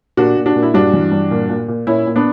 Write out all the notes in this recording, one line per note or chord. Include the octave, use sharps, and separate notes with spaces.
A#2 D4 F#4
A#2
D4 F#4
A#2
E4
G2 D4 F#4
E3
G2
A#2
A#2
A#2
A#2 C#4 E4
A#2
B3 D4